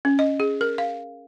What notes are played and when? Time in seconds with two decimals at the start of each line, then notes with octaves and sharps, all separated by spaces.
0.05 C#4
0.19 D#5
0.40 G#4
0.61 A#4
0.78 F5